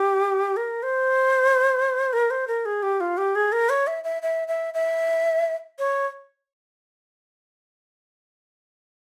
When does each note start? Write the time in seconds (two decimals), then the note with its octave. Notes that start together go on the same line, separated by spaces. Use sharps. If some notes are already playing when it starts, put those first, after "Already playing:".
Already playing: G4
0.57 A#4
0.83 C5
2.13 A#4
2.30 C5
2.48 A#4
2.65 G#4
2.83 G4
3.00 F4
3.17 G4
3.35 G#4
3.52 A#4
3.69 C#5
3.87 E5
4.04 E5
4.22 E5
4.48 E5
4.74 E5
5.79 C#5